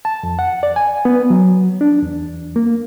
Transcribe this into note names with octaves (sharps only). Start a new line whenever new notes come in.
A5
F2
F#5
D5
G#5
B3
F#3
D4
E2
A#3